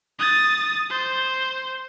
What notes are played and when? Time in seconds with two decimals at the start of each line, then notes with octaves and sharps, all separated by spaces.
0.19 D#6 A6
0.90 C5